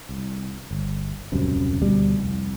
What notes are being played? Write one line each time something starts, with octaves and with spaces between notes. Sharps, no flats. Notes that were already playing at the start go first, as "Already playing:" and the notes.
C2
G1
D#1 C#2 F#2 C3
D2 B2 G3
F1 C2